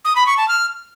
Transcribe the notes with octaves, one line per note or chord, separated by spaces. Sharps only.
D#6
B5
C#6
A5
F6